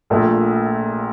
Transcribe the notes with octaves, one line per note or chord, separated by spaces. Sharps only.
A#1 A#2 A3